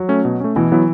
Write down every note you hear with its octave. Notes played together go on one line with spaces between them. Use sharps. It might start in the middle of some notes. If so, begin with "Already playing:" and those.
Already playing: F#3
A3 C#4
B2
A3 C#4
B2 E3
F#3 B3 E4